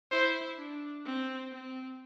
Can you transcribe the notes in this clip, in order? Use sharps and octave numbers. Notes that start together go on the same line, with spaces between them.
E4 C5
D4
C4
C4